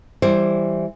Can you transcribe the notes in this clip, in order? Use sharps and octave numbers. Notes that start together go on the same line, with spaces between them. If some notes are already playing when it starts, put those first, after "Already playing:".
E3 G3 C5